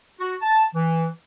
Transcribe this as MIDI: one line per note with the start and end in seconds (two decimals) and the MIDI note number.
0.19 0.34 66
0.41 0.64 81
0.75 1.06 52